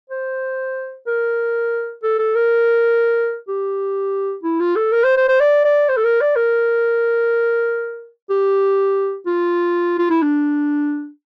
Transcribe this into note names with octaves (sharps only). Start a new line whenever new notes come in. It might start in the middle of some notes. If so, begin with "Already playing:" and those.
C5
A#4
A4
A4
A#4
G4
E4
F4
A4
A#4
C5
C5
C5
D5
D5
C5
A4
A#4
D5
A#4
G4
F4
F4
E4
D4